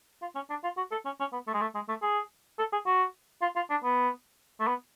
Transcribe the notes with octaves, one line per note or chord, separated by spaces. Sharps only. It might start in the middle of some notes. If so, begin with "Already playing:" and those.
F4
C#4
D4
F4
F#4
A4
C#4
C#4
B3
A3
G#3
A3
G#3
A3
G#4
A4
G#4
F#4
F4
F4
D4
B3
A3
B3